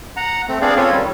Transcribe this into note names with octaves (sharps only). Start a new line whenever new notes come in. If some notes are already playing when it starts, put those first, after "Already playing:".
F#5 A#5
A3 C4
B3 C4 D4 G#4 D5 F5
C4 C#4 F4 A4 C#5
D#3 G3